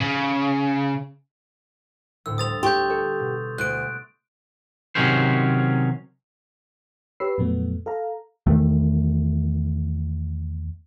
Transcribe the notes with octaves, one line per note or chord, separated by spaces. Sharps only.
C#3
D2 A2 E6
G3 C5 A#5 D#6 A6 F7
G4 C6 C#6 G6
A4 C#5 D5
B2
D2 F#6 D7
C3 D#3 F#3 C#4 C5
G4 B4 C#5 B5 E6 C7
F2 A#2 F#3 A3 B3
A4 F5 A#5
E2 D#3 A3